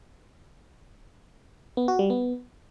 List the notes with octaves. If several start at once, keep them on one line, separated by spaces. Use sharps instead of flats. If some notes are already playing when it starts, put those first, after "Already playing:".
B3
F#4
G3
B3